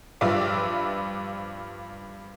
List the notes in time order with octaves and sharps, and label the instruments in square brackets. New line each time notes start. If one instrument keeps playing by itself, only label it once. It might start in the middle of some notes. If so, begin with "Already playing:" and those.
[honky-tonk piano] G2 F3 F4 B4 D5 E5